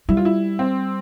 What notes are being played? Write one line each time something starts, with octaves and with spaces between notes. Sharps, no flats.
G3 E4
F4
E4
C4